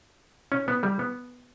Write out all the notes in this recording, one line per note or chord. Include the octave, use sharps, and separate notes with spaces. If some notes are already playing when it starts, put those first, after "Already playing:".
C#4
B3
G3
B3